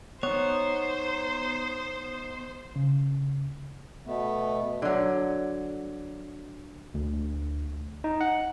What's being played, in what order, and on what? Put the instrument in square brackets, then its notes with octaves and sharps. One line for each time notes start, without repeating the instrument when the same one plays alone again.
[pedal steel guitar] B3 D#4 [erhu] C5 [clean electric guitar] C#5
[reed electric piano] C#3
[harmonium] B2 A3 B3
[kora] D3 F#3
[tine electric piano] D2
D#4
F#5